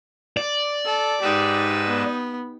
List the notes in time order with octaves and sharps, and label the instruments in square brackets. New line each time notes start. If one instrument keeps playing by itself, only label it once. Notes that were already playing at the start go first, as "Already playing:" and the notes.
[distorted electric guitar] D5
[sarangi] A4
[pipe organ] G#2 B4 E6 [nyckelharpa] D#4 [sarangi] G4
[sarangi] B3